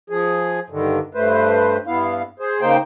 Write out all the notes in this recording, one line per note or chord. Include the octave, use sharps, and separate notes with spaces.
F3 G#4
G2 D3 D#3
G2 A3 B4 C5
G2 B3 E4 F5
G#4 C5
C#3 A#3 D#4 C5 G5